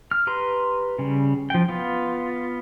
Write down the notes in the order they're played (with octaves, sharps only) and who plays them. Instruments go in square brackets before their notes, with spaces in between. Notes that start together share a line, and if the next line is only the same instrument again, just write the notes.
[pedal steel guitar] F6
G4 B4 A#5 C6
C#3 G3
F3 G5
B3 F4